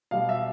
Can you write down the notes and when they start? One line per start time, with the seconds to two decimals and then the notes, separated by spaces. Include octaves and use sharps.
0.11 B2 G3 F5
0.29 E5